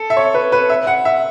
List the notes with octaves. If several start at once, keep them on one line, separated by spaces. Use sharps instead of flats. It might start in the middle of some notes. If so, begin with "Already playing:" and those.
Already playing: A4
E5
C#5
B4
B4
E5
F#5
E5